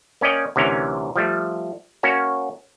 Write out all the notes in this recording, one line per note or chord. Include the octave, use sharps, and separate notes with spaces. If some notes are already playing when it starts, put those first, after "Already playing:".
A#3 C#4 D5 D#5 G5
D2 C3 E3 C#4 A#4
F3 G3 A3
A#3 C#4 F#4 C#5